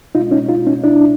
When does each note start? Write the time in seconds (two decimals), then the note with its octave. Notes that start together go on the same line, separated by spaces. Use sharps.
0.15 B2 D#4 F4
0.19 G#3
0.31 C#4 D#4
0.49 D#4 F4
0.67 C#4 D#4
0.84 D4 E4